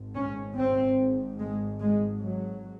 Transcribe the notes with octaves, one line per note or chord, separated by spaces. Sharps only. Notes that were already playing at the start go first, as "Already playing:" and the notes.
Already playing: G#1 G#2
C#4
C4
G#3
G#3
F#3